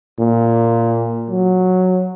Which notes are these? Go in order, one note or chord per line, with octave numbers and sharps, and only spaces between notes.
A#2
F#3